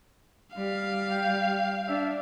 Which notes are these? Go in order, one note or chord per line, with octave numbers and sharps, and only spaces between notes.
G3 F5
G5
D4 E5